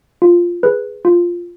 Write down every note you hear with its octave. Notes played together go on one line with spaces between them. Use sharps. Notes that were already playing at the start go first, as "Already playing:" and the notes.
F4
G#4 B4
F4